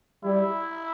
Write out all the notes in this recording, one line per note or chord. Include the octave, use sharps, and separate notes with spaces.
G3 E4